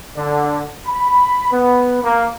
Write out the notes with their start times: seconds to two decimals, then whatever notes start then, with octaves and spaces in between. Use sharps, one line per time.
0.16 D3
0.87 B5
1.52 B3
2.03 A#3